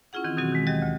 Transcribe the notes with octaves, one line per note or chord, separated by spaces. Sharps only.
C#4 E4 F4 G#4 F#5
D#3 E3 C4 E4
B2 D#3 E3 F#3 C4 F#4
D#3 G#3
D#2 E3 F#3 G4 D#5
D2